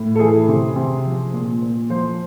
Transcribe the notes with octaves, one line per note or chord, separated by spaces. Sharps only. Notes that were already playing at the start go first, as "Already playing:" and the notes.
Already playing: A2
A4
E3 G#4
C3
C3
F3
A#2
A#2
F3 C5